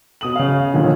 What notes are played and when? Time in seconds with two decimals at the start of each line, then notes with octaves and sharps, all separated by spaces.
0.21 B2 D#6 F#7
0.36 C#3 F5
0.74 D#2 A#2 D3 D#3 F3